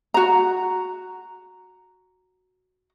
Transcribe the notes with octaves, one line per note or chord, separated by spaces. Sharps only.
F#4 A#5